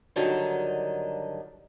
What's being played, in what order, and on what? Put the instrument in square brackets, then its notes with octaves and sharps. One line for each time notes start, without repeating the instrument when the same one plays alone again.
[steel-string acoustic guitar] G2 D3 D#3 F#3 D4 D#4